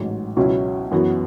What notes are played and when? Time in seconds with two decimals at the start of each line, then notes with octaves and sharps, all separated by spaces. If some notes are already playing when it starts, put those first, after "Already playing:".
Already playing: A1 G#2 F#3
0.37 C#2 B2 F#3 C#4 E4
0.91 F#2 E3 B3 F#4